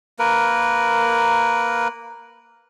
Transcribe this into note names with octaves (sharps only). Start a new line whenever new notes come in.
A#3 A#4 B4